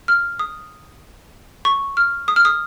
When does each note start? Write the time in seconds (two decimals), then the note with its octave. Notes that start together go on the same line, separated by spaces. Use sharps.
0.08 F6
0.39 D#6
1.65 C#6
1.97 F6
2.28 D#6
2.36 F6
2.45 D#6